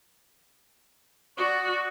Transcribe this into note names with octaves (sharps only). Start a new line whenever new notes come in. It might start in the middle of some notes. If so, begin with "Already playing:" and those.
F#4 D5 C#6 D#6